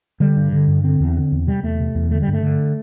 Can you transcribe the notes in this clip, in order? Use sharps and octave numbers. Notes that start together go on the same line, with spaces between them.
D3 G3
G2
D3
G2
D3 C4
E2
D3
E2
C3 G3
E2 A3
C3
E2
D3 A3
G3
G2
A3
D3